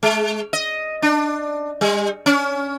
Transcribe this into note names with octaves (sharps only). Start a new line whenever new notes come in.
G#3
D#5
D4
G3
C#4